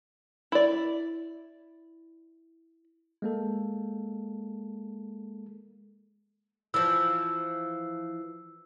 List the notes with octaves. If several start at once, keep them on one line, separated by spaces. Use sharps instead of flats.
E4 D5
G#3 A#3 A4
E3 F3 E6